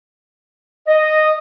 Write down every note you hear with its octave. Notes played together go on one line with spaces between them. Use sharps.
D#5